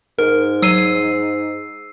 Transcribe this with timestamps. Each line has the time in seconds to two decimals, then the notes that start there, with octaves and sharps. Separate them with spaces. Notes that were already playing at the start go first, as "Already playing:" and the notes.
0.19 G#2 A#4
0.62 F#3 E6 C7 D#7